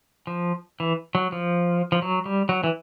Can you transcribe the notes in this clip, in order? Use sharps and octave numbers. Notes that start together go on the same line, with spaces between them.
F3
E3
F#3
F3
F3
F#3
G3
F#3
E3